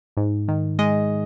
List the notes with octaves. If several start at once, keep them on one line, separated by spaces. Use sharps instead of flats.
G#2
D#3
G#3 D#5